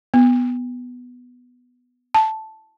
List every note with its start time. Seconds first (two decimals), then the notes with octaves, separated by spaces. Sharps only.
0.14 B3
2.14 A5